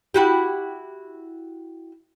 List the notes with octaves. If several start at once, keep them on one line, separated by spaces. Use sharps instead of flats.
E4 F#4 G4